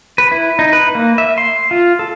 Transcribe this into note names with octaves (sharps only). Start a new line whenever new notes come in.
B4
E4
D#4
B4
A#3
E5
C6
F4
A4